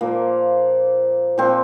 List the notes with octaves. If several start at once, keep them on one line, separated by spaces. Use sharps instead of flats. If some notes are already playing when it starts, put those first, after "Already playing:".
A#2 F3 A#3
A#2 F3 C4